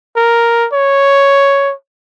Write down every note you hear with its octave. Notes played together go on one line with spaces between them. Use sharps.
A#4
C#5